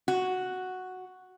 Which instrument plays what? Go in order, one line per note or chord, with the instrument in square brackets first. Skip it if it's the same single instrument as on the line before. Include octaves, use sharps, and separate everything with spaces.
[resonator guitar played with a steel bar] F#4